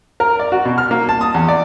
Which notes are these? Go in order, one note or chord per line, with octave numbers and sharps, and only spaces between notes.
A#4
D5
F#4
B2
F6
A#3
A5
D#6
E2
D5